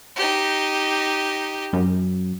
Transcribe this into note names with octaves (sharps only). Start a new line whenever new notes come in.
D#4 G4
F#2